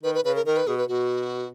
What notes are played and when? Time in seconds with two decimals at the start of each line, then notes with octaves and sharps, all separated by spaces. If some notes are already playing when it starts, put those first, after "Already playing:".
0.03 D#3 B4
0.15 B4
0.25 C#3 B4
0.35 A#4
0.46 D#3 A#4
0.57 B4
0.67 B2 G#4
0.78 B4
0.88 B2 F#4